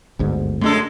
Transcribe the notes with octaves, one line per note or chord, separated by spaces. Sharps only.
G1 D2 G#2
F#2 G#3 A3 D4 A4